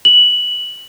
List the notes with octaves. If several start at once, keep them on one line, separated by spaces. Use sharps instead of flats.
F#7